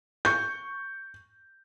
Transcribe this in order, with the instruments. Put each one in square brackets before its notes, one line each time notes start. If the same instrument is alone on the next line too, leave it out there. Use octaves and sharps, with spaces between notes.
[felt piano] C#6 G6